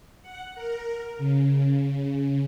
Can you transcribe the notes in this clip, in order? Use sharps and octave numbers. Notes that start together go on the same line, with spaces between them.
F#5
A#4
C#3